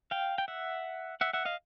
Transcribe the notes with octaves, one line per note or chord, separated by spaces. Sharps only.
F5 G5
G5
E5 F#5
E5 F#5
E5 F#5
D#5 F5